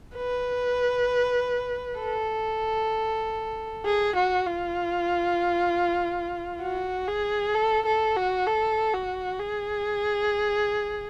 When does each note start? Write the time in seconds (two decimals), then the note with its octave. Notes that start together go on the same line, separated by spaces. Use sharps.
0.16 B4
1.99 A4
3.85 G#4
4.15 F#4
4.47 F4
6.61 F#4
7.08 G#4
7.54 A4
7.86 A4
8.16 F#4
8.47 A4
8.93 F#4
9.39 G#4